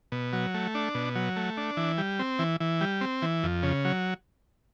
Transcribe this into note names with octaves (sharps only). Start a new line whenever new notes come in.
B2
F#3
A3
D4
B2
F#3
A3
D4
E3
G3
C4
E3
E3
G3
C4
E3
F2
C#3
F#3